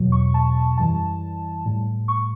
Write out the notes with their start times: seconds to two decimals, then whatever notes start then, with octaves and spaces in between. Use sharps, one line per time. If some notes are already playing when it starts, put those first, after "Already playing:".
Already playing: E2 B2 F#3
0.12 C#6
0.34 A5
0.77 F#2 E3 G3 A5
1.66 A2 G3
2.08 C#6